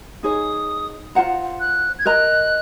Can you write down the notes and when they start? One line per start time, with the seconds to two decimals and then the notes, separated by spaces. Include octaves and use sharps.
0.23 D#4 G#4 C#5 D#6
1.15 F4 C5 F#5 A#5
1.60 F#6
1.99 G#6
2.06 A#4 D#5 A#5 F#6